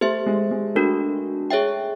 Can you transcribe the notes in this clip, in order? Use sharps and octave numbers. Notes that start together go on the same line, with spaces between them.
A3 G4 C5 E5
G#3
G#3
A3 D4 F#4 A#4
G#4 C#5 E5 G5